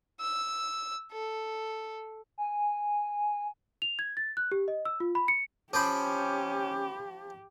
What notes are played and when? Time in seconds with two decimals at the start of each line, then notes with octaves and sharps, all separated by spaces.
0.21 E6
1.12 A4
2.38 G#5
3.82 F7
3.99 G#6
4.17 A6
4.37 F#6
4.52 G4
4.68 D#5
4.85 E6
5.00 F4
5.15 B5
5.28 C#7
5.73 F3 C#4 G4 C5 G5 B5 D6